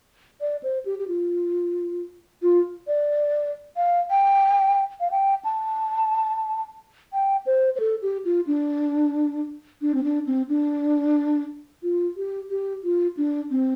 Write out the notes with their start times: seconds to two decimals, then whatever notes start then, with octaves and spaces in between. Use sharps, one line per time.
0.41 D5
0.63 C5
0.85 G4
0.99 G4
1.08 F4
2.43 F4
2.87 D5
3.77 F5
4.10 G5
5.00 F5
5.11 G5
5.45 A5
7.13 G5
7.46 C5
7.76 C5
7.80 A4
8.02 G4
8.25 F4
8.47 D4
9.82 D4
9.94 C4
10.04 D4
10.27 C4
10.49 D4
11.83 F4
12.17 G4
12.50 G4
12.84 F4
13.17 D4
13.51 C4